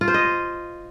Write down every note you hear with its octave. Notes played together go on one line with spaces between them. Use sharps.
F4
C5
D#5